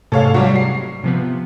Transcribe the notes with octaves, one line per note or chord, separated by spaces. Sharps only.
G#2 C3 A3 A4 C#5 F5
F#3 G3
C7
C3 F3 B3